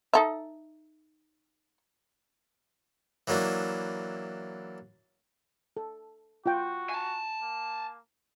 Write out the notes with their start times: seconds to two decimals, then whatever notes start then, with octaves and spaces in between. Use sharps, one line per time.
0.13 D#4 A4 E5
3.28 E3 F#3 A#3 D4 E4
5.77 A4
6.46 F4 F#4 G5
6.89 G#5 A5
7.42 A#3